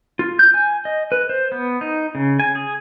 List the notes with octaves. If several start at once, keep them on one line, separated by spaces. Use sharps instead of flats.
F4
G6
G#5
D#5
B4
C5
B3
D#4
C#3
G#5
G#4